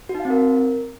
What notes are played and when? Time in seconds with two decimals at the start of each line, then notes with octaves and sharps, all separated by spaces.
0.09 F#4
0.15 D#4
0.20 F5
0.25 C4
0.30 A#4